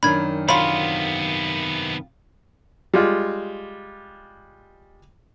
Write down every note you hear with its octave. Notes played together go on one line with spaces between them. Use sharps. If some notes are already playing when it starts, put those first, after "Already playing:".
F#2 D#3 D4 B5 G#6
C3 F#3 B3 F4 B5
G3 G#3 F4